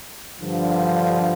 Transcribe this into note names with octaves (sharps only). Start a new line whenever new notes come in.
G2 D3 F3